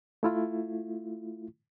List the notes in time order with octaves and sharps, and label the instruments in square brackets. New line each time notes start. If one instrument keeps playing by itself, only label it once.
[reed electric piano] A3 E4 F4